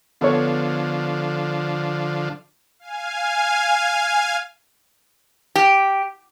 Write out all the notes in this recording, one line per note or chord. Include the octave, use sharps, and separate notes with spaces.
D3 F3 B3 A4 C#5
F5 G#5
G4